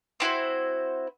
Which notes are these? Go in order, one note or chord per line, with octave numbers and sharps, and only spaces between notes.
C4 E4 F#4 C5